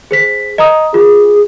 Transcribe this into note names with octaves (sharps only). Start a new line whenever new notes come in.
G#4 C5 B6
D#5 A#5 D#6
F4 G#4